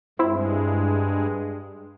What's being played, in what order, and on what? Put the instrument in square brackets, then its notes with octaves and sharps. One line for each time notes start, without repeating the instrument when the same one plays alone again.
[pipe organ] G2 G#3 [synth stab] C4 E4